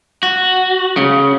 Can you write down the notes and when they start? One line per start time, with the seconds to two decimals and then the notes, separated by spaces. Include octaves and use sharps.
0.23 F#4
0.97 C#3